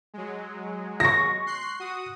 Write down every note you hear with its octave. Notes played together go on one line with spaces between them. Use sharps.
F#3 G#3
C#6 A#6
C6 F#6 C7
F#4 D#6